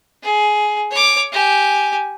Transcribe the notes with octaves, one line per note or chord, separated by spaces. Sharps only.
G#4
C#5 D6
G4 G#5